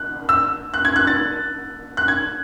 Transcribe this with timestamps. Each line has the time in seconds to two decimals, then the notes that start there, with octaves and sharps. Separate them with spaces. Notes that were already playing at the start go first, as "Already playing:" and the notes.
Already playing: F#6
0.29 E6
0.74 F#6
0.85 G#6
0.96 F#6
1.07 A6
1.97 F#6
2.08 G#6